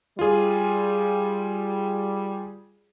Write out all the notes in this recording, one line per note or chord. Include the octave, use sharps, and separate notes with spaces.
G3 F4 G#4